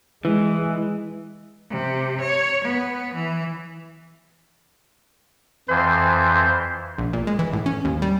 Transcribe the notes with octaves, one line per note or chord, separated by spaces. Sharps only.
E3 G#3
C3
C#5
B3
E3
F2 E3 C5
A#1
A#2
G#3
E3
A2
C#4
D#2
G3